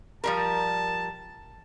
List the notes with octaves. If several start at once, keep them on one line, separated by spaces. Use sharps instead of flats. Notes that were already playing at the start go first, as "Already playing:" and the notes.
F3 G3 A#4 A5